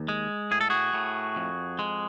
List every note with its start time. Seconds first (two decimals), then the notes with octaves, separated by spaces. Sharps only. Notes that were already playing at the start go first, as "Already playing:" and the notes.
Already playing: D#2
0.08 G#3
0.51 A2 G#4
0.61 A4
0.70 F#4 G#4
0.94 A2
1.36 F2
1.79 G#3